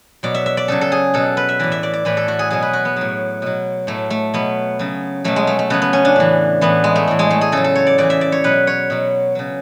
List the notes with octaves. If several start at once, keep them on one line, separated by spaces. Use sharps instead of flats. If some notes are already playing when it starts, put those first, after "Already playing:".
B2 F#3 D5
E5
E5
D5
C#3 F#3 A4
A4
G#4
B2 F#3 A4
B4
E5
A2 E3 D5
E5
D5
D5
A2 E3 B4
A4
F#4
G#4
B2 F#3 G#4
B4
F#4
B3
A2 F#3
B2 F#3
A2 F#3 A3
A3
B2 F#3 B3
C#3 F#3
B2 F#3 A3
G#3
A3
A3
C#3 F#3 B3
B3
C#4
D4
A2 E3
A2 E3 B3
G#3
A3
A2 E3
G#3
A3
G#4
C#3 F#3 A4
A4
C#5
D5
C#3 E3 D5
E5
D5
C#5
B2 F#3 B4
C#5
B2 F#3
C#3 F#3